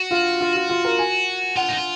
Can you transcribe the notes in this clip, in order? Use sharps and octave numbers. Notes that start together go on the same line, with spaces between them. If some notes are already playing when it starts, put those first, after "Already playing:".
Already playing: F#4
F4
F4
F4
F4
A#4
G#5
F4 F#5
D#4
F4